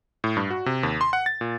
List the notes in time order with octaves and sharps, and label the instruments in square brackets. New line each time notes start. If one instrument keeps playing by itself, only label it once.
[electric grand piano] A2
G2
F#4
C3
D#2
C6
F#5
A6
A#2